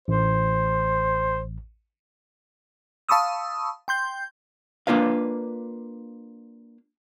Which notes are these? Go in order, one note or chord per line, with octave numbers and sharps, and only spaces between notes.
A1 C5
F5 A5 B5 C#6 D#6 E6
G5 C6 G6
A#3 D4 F4 B4 F5